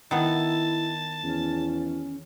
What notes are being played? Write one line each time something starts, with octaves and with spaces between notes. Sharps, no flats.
D#3 B3 E4 A5
E2 C#4